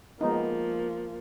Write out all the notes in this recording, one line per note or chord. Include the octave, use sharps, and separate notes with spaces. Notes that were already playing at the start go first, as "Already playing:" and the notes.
F3 G#3 A#3 B3 D#4